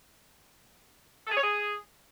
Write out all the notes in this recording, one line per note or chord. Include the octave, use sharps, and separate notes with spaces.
A4
G#4
C#5
G#4